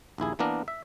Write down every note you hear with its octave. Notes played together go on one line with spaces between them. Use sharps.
A#1 D#2 E4 G#4
E3 A#3 B3 D4 A#4
E5